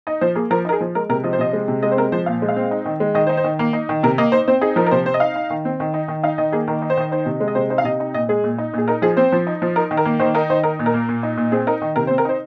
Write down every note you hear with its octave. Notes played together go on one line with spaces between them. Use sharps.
D#4 D#5
F3 C5
A#3 G#4
F3 A#4
D#4 A#4
G#4
F3
G#3 A#4
C3 A#4
F3 D#5
C5
C3 D#5
G#3
C3
G#3 D#5
C5
C4 A#4
F3 C5
A#2 F5
G#3
F5
C4
D#4
D#3
G#3
D#3 D#5
C5
D#4
C5
D#3
A#3
D#4
D#3
C3 A#4
A#3 D#5
D#4 C5
C4 C5
D#4 G#4
F3 A#4
A#4
C3 C5
C4 C5
D#5
D#4 F5
D#4
D#3
C4
D#3
D#4
D#3
D#4 F5
D#3 D#5
A#3 G#4
D#3 A#4
D#4
C5
D#3 D#5
D#4 C5
C3
G#3
D#5
C3 C5
D#4 C5
F5
C3 D#5
D#4
A#2 D#5
G#3 G#4
A#2
D#4
A#2 G#4
D#4 A#4
F3 G#4
C4 C5
F3
D#4
F3
D#4 A#4
D#3
A#4
A#3
D#3 C5
D#4 A#4
D#3 C5
D#4 A#4
A#2
A#4
A#3
A#2
D#4
A#2
C4 G#4
D#4 A#4
D#3
C3 A#4
C5
C4
A#4
D#4 C5